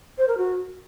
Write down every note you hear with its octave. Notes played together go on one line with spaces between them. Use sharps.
C5
A#4
F#4